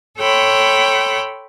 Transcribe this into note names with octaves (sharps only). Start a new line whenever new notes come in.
A4 C#5 G5 B5 C6